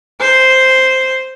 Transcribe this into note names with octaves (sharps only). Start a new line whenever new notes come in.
C5